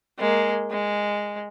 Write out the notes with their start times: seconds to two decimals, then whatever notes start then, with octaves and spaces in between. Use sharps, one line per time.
0.19 G#3 A#3
0.70 G#3